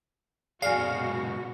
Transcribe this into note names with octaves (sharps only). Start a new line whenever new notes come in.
F#2 B2 G#3 F#4 D5 F5 G#5